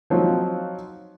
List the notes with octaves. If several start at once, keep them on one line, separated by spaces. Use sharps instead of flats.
F3 F#3 C4 D#4 F4